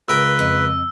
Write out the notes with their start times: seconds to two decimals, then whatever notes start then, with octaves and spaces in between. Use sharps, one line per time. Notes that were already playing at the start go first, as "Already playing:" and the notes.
0.08 C#2 A#4 B4 G5 E6
0.39 F2 D#5